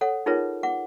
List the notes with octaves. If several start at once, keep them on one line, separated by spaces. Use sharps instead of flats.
A4 C#5 F#5
D#4 F4 G#4 A#4 B4 C#5
F#5 D6